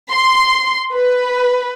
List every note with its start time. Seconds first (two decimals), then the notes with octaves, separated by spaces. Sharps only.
0.11 C6
0.94 B4